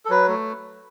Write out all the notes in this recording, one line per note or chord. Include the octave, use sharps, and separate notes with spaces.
A4
F#3 B4
A3